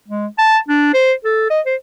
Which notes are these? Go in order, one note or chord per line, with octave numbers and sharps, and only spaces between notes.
G#3
A5
D4
C5
A4
D#5
C5